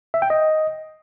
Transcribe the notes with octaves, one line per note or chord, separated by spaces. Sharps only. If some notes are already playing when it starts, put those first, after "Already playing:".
E5
G5
D#5